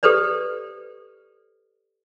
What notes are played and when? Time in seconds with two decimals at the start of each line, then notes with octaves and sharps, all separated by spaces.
0.03 G4 A4 B4 C5 D5